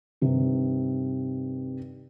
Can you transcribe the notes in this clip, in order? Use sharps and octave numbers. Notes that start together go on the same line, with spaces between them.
G2 C3 D#3